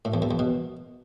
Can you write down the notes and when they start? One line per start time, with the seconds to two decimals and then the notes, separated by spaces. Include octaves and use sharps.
0.05 A2
0.14 E2
0.22 F#2
0.31 E2
0.39 B2